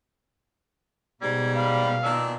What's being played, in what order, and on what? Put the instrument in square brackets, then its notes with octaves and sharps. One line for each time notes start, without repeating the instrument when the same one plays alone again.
[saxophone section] G#2 G3 [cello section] B2 [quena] G#6
[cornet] F5 [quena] B5
[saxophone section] A#2 D#3 D4 [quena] E6